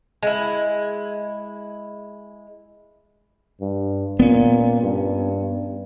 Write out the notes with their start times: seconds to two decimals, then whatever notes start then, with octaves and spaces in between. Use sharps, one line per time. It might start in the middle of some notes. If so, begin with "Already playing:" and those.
0.23 G#3 E4
3.61 G2
4.20 A#2 B3 C#4
4.83 G2